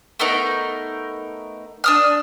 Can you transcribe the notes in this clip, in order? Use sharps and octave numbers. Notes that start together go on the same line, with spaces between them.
A3 B3 D#4 A#4
D4 D#6 F6